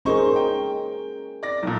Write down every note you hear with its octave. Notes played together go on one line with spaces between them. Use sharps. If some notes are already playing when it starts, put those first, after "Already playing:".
C#4 D#4 G#4 A#4 C5 C#6
G5
D5 A#6
B1 A#2